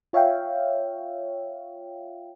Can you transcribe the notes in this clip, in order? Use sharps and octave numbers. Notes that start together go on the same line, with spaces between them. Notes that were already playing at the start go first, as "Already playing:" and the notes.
F4 C#5 E5 F5 G5